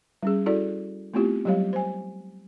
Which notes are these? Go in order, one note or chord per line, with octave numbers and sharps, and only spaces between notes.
G3 C#4 G#4
E4 F#4 A4 D5
A3 B3 C4 E4 F4 G4
F#3 G3 G4 C#5 F5
C5 G#5